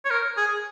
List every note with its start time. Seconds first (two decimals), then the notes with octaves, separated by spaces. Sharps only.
0.05 C#5
0.10 A#4
0.37 G#4